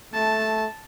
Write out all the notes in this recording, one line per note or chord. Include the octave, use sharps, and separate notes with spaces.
A3 A5